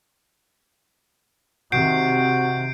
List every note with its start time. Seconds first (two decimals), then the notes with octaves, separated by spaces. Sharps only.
1.72 C3 D#3 F#4 G6 C7 D7